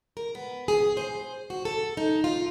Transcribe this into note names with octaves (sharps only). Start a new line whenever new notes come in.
A#4
B3
G#4
C5
F#4
A4
D#4
F4